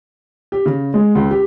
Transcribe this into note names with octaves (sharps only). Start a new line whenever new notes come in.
G4
C#3
G#3
C#2
G4